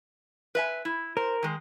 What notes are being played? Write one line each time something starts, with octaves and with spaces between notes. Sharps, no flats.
B4 E5 G#5
E4
A#4 C5
D#3 G#3